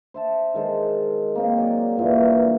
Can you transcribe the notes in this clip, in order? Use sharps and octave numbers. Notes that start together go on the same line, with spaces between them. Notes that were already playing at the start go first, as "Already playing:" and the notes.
C5 E5 A5
D#3 G#3 A4 C5
A#3 C4 D#4
F#3 G#4 D5
G2 A#2 E3